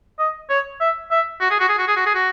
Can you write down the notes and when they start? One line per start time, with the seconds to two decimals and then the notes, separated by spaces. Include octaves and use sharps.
0.19 D#5
0.49 C#5
0.80 E5
1.11 E5
1.41 F#4
1.50 G#4
1.60 F#4
1.69 G#4
1.78 F#4
1.87 G#4
1.96 F#4
2.06 G#4
2.15 F#4